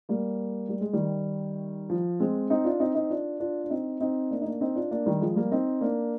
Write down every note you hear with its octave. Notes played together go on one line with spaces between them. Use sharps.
G3 A#3
G3
G#3
D#3 G3
F3
G#3 C4
C4 D#4
D4 F4
C4 D#4
C4 D#4
D4 F4
D4 F4
D4
C4 D#4
C4 D#4
A#3 D4
D#4
A#3 D4
C4 D#4
D4 F4
A#3 D4
D#3 G3
F3 G#3
G3 A#3
C4 D#4
A#3 D4